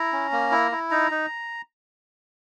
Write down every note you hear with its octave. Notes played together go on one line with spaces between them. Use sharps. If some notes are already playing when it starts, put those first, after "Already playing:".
Already playing: E4 A#5
C#4
A#3
E4
E4
D#4 A#5
D#4